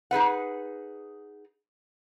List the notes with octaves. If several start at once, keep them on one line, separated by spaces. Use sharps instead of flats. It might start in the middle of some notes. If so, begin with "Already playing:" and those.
D#4 G#4 B4 F#5